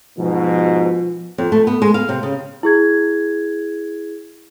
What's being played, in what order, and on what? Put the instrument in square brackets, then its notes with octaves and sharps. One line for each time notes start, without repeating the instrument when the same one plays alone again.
[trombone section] G#2 B2 [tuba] F3
[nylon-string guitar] F2
A3
B3
G#3
F5
C3
C#3
[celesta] E4 G#4 G#6